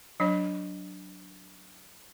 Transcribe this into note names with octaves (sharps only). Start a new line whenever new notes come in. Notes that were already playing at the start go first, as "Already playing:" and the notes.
F#3 D4 C#5